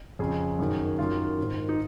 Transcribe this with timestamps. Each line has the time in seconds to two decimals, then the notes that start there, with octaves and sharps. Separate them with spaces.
0.19 F2 C#3 G#4
0.59 F#2 D#3
0.99 F#2 D#3 F4
1.38 G#2 D#3
1.69 D#4